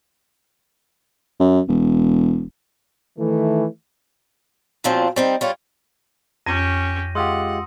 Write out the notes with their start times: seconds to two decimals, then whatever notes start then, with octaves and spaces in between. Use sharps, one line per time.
1.40 F#2
1.68 E1
3.19 D#3 E3 A3
4.84 E2 A#2 F3 F#3 C4 F4
5.16 G3 C4 D#4
5.41 G3 F4 C#5
6.46 F2 C#4 G4 A#6 D#7
7.15 G#3 F4 G4 F#5 C6 D#6 E6